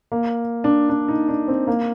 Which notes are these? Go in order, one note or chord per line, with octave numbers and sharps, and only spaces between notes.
A#3
D4
D4
D#4
D4
C4
A#3